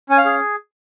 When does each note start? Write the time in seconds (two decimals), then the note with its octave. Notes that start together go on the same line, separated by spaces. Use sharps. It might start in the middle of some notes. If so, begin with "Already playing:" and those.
0.09 C#4 G#5
0.18 F5
0.25 G#4